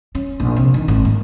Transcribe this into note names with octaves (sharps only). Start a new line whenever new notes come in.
C#4
A#1
C3
D#3
G#1
A#3